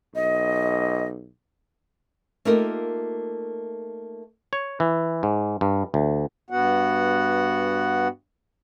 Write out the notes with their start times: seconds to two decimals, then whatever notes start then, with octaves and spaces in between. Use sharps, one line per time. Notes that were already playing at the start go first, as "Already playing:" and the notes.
0.15 B1 D#5
2.45 A3 A#3 D#4 F4 G4 A#4
4.53 C#5
4.80 E3
5.23 G#2
5.61 G2
5.94 D2
6.50 G2 B3 F#4 F#5